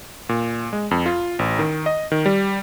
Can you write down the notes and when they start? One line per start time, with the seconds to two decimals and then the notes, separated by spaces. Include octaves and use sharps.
0.29 A#2
0.73 G#3
0.91 F2
1.06 F4
1.39 A1
1.59 D#3
1.86 D#5
2.12 D#3
2.26 G3